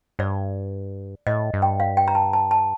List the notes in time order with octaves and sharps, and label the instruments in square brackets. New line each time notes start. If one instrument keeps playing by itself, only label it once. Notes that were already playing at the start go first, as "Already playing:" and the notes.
[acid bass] G2 [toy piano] D5
[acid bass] A2 [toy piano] D#5
[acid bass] G2
[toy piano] G5
F5
G5
A#5
A5
A5
A5